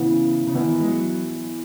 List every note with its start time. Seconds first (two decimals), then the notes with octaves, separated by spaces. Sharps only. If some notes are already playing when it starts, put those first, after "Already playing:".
Already playing: C#3 E3 B3 E4
0.47 C#3
0.55 D#3 E3 B3 E4
0.80 G#3
0.87 F#3